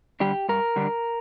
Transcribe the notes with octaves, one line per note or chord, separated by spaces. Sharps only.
D3 G3 D4 G4
G2 A#4
D3 G3 D4